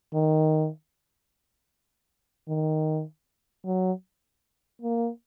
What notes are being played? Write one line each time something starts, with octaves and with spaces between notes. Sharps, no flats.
D#3
D#3
F#3
A#3